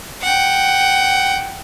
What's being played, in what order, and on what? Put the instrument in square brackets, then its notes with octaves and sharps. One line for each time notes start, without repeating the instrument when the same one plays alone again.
[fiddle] F#5 G5